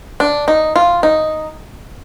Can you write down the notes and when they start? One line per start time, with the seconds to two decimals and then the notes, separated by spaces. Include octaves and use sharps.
0.20 D4
0.48 D#4
0.76 F4
1.03 D#4